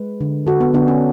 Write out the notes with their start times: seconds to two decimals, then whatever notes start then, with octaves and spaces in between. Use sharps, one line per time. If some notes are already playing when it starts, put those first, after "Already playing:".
Already playing: G#3 B4
0.21 D3
0.47 D3 F#4 A4
0.61 B3
0.74 D3 B3 D4
0.88 C#4